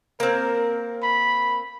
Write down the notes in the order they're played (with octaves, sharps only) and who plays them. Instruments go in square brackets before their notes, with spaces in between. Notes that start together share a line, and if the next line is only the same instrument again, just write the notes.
[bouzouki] A#3 C4 [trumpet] A#4
[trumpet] B5